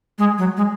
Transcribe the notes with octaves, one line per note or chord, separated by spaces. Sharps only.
G#3
F#3
G#3